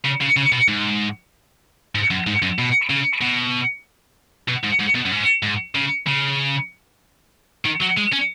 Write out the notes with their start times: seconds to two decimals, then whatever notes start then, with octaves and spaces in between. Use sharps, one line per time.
0.04 C#3
0.21 C#3
0.36 C#3
0.52 B2
0.68 G#2
1.95 G#2
2.11 F#2
2.27 G#2
2.42 F#2
2.59 B2
2.90 C#3
3.21 B2
4.48 B2
4.64 G#2
4.80 G#2
4.95 B2
5.06 F#2
5.12 G#2
5.43 G#2
5.75 C#3
6.07 C#3
7.65 D#3
7.81 F#3
7.97 G#3
8.12 C#4